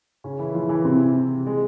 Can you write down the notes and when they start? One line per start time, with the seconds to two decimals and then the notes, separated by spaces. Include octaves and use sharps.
0.24 C#3 C#4
0.39 E3 E4
0.54 F3 F4
0.69 E3 E4
0.85 C3 C4
1.46 G#3